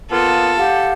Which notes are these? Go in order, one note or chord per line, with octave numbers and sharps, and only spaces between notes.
A#3 B3 F4 A4
G4 F5 F#5